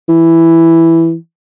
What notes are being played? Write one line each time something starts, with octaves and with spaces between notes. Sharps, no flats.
E3